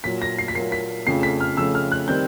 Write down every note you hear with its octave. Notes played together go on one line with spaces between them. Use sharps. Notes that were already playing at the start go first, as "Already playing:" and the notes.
A#2 F#3 A#3 B6
A#6
C7
B6
A#2 F#3 A#3 C7
B6
F2 C#3 F3 A3 C7
B6
F6
F2 C#3 F3 A3 E6
F6
F#6
D#3 G3 C4 G6